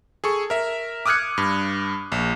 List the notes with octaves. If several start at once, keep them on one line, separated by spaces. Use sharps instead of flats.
G#4 A4 C#6
A#4 E5
D6 D#6 F6 F#6 G#6 C#7
G2
A#1